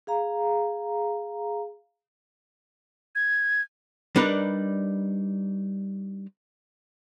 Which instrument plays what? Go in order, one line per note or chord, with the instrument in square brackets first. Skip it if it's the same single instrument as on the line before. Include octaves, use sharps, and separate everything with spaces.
[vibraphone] G#4 F5 A#5
[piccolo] G#6
[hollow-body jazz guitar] G3 D4 D#4 A#4 B4